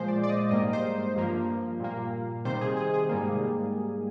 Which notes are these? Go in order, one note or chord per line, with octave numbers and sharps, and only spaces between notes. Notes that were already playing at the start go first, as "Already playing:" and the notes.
Already playing: A#2 F3 G#3 C5
D5
D5
D#5
G#2 G3 A#3 D#5
C5
G2 F3 A#3
A#2 G3 A#3
C3 D#3 G3 C5
G#4
G#4
G#4
G#2 G3 A#3